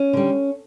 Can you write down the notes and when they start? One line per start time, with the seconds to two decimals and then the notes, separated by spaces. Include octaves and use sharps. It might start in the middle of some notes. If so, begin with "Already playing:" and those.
Already playing: C#4
0.13 D3 G3